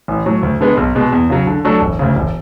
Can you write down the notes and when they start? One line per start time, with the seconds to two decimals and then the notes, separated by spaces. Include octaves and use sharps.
0.08 A1
0.26 A2 F#3
0.43 D2
0.61 D3 G#3 B3
0.77 B1
0.95 B2 G#3
1.12 E2
1.30 C#3 F#3
1.47 D3
1.64 F#3 A3 D4 A4
1.81 E1
1.99 D2 C#3
2.16 E1